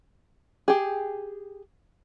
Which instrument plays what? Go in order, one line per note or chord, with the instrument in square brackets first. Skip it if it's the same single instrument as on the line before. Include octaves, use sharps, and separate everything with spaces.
[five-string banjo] G4 G#4